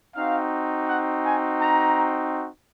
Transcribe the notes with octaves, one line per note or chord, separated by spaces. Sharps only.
C4 D#4 F#4 F5
F#5
G#5
A#5